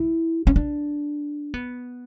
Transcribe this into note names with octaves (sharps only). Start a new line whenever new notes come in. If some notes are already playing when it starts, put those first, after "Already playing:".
Already playing: E4
C#4
D4
B3